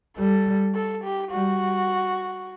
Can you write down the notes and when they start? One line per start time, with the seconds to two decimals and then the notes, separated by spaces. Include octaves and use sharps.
0.18 G3 A4
0.75 A4
1.04 G4
1.32 G3 F#4